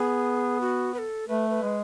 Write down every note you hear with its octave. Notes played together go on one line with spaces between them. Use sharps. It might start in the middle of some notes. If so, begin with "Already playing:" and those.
Already playing: B3 G#4
F#4
B4
A4
A3 B4
B4
G#3